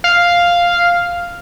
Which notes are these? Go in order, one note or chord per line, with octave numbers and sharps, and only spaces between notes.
F5